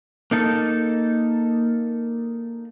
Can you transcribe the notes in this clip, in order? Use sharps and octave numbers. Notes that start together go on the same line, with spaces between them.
A#3 D#4 A4